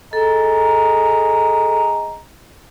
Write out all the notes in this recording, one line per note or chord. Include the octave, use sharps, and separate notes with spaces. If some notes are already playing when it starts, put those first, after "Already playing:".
G#4 A4 D#5 A#5